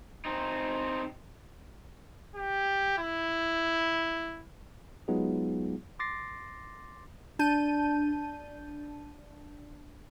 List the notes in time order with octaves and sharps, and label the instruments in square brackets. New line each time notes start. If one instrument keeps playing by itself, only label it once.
[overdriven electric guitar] C4 D#4
[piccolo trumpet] G4
E4
[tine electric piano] F#3 G#3 B3 D#4 F4 G#4
C6 D6 A6 A#6 C7
[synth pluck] D4 A5 G6 D#7